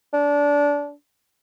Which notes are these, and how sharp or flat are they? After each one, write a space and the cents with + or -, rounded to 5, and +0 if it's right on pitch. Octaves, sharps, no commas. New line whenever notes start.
D4 -20